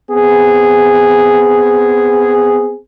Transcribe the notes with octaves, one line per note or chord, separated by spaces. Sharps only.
B3 C4 G#4